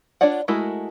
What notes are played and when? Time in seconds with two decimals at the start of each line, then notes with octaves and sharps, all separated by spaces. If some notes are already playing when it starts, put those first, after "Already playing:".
0.21 D4 F4 C#5 D5 F#5
0.48 G#3 A3 E4 F#4 A#4